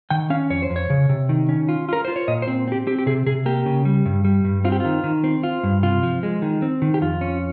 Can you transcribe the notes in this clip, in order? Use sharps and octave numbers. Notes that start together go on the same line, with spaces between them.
D#3 G5
C#4 F5
F2 C#5
C5
F2
C#5
C#3
C3
D#3
C#4
F4
F4 A#4
F4 C5
C#5
A#2 D#5
C5
C4
C4 G4
C4 G4
G4
C3 G#4
C3 G#4
A#3 G4
C#3
G3
G2
G3
G2
C4 F4
G4
D#3 F4
D#3
C4
F4
G2
C3 F4
F3
G#3
D#3
C4
D#3
G4
F2 F4
C#4